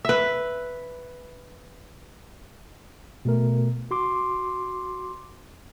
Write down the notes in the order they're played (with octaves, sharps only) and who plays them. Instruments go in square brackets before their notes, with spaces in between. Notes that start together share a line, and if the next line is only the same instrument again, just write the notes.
[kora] B4 E5
[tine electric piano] B2 A3 A#4
F#4 C6 D6